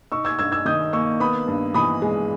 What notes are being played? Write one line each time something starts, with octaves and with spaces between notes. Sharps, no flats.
D#4 C#6 E6
E6 G#6
G2 E6 G#6
E6 G#6
D#3 D#6 G6
A#3 C#6 E6
B3 B5 D#6
G2
E3 B5 D#6
G#3